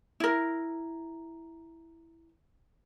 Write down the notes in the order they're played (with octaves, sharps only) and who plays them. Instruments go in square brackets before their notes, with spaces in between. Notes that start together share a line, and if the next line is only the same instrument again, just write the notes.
[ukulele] E4 A#4